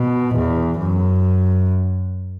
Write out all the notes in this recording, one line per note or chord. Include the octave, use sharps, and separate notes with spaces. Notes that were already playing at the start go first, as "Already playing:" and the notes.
Already playing: B2
E2
F#2